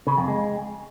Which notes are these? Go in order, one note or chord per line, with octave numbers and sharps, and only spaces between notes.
C#3
F2
G#3